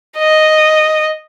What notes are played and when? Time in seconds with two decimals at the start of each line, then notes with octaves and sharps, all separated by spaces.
0.18 D#5